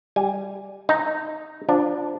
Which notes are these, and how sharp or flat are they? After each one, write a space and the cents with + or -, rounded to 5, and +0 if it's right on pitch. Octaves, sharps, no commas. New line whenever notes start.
G3 +0 G#5 +0
D#4 -5 A#5 -30
F3 +0 D4 +0